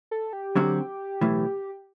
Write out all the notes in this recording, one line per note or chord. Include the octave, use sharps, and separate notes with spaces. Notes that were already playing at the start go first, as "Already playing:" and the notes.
A4
G4
D3 F#3 C4 F#4
B1 A2 E3